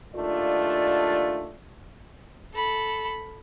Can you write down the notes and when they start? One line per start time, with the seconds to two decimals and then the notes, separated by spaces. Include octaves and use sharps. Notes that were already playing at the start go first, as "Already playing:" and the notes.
0.15 D#2 A3 D4 F4 D5
2.53 A4 B5